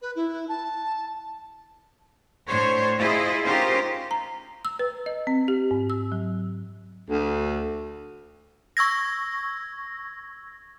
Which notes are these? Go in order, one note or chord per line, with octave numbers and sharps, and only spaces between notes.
B4
E4
A5
A2 D4 C5 C#5
E4 F4 G#4 C5 D#5
C#4 D#4 F4 G4 A#4 C5
A#5
E6
B4
D#5
C4
G4
G#2
E6
F#3
D2
C#6 E6 G#6 A#6